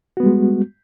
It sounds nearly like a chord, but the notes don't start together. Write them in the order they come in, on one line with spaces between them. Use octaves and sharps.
F#4 B3 G3 G#3